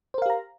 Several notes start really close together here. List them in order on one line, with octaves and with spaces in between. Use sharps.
C5 A#4 F5 G4 A#5